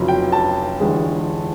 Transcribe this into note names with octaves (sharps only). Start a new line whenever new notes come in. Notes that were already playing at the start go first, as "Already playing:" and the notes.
Already playing: F1 F2 C#3 F#3
G5
A5
G1 G2 E3 G#3